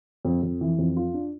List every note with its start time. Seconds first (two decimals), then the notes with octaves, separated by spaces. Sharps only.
0.25 F2
0.43 F2
0.61 E3
0.78 F2
0.97 F4
1.14 D4